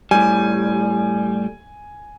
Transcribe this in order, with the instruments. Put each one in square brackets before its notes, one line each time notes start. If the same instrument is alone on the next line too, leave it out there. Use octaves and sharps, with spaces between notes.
[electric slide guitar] A2 G3 [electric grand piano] G#5